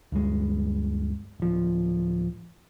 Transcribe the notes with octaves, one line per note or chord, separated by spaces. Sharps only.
D2 G2 G#3
D1 F3